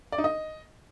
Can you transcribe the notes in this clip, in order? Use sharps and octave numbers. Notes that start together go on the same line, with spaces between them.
D5
D#4
D#5